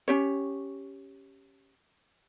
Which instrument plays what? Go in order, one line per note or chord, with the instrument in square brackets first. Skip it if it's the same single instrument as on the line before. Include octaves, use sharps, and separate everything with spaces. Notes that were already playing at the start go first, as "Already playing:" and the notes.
[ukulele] C#4 G4 C#5